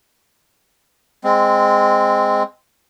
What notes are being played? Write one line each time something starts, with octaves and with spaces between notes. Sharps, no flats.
G#3 C4